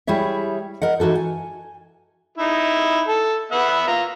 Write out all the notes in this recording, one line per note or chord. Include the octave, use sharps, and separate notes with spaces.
G3 E4 G#4 C#5 E5
A#4 D#5 F#5
E3 D#4 F#4 A4
G#5
D#4 E4
A4
B3 E5 F#5
F4 A#5